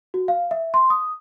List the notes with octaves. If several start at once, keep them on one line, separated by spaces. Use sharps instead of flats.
F#4
F5
E5
C6
D#6